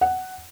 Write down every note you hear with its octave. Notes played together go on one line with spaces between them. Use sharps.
F#5